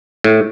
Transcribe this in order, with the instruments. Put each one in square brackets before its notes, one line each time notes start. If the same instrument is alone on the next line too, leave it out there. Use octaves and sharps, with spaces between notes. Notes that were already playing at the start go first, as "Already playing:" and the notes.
[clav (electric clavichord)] A2